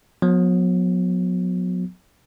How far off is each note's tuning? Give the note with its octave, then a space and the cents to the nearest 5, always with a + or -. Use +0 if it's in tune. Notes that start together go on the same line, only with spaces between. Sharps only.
F#3 -40 B3 +0